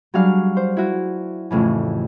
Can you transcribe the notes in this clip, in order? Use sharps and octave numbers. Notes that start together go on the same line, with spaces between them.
F#3 G3 D4 G#4 F5 F6
C5
E4 F#4
F2 A2 C#3 E3